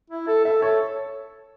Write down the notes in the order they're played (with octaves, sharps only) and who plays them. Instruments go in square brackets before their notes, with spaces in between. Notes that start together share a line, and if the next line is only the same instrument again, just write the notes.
[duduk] E4
A4
[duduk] A4 [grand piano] E5
[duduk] A4 [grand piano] C#5